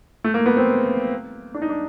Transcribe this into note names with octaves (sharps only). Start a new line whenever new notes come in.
A3
A#3
B3
C4
D4
D#4
D4